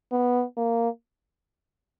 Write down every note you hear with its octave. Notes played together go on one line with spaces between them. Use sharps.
B3
A#3